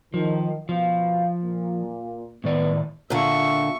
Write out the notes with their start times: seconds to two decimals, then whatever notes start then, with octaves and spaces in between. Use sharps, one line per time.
0.14 D#3 F3
0.69 B2 F3 F5
1.42 A#2
2.44 A2 D#3 B3 D5
3.10 A#2 D3 E5 C#6